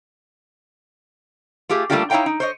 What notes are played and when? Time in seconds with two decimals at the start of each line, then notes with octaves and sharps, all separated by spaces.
1.69 A3 F4 G4 G#4
1.90 G3 A3 A#3 D4 F4 G4
2.10 D#4 E4 C#5 F5 G5 A#5
2.26 D#4
2.40 C5 C#5 D#5